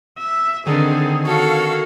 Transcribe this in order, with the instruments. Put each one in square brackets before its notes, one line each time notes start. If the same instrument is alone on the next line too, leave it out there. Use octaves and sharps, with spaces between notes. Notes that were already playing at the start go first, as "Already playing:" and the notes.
[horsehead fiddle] E5
[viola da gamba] D3 [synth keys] D#3 [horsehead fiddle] C4 G#4
[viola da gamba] F#4 [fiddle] A4 [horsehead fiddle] C#5 F5